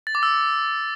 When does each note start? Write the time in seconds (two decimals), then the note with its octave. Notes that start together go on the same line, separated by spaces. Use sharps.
0.07 A6
0.15 D6
0.23 E6